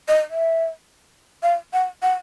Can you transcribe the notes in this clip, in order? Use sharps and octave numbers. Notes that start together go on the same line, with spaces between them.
D#5
E5
F5
F#5
F#5